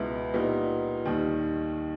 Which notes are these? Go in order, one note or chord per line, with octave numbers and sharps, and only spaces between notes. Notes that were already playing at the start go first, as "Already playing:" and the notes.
Already playing: C#2 B2 G#3 B3 E4
A#2 G3 B3 D#4
D#2 D#3 G3